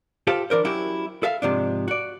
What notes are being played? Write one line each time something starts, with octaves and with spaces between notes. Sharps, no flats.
F4 G4 A4 C5 F5
E3 D4 A#4 C5
F#3 C#4 E4 F#4 G4
A4 E5 F5
G#2 C3 F3 D4
F#4 D5